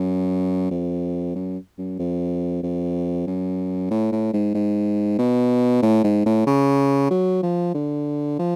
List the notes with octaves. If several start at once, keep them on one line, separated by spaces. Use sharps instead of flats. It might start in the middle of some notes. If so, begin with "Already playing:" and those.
Already playing: F#2
F2
F#2
F#2
F2
F2
F#2
A2
A2
G#2
G#2
B2
A2
G#2
A2
C#3
F#3
F3
D3
F3